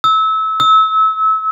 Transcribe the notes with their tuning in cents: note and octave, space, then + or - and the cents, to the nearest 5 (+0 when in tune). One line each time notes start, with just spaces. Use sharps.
E6 -25
E6 -30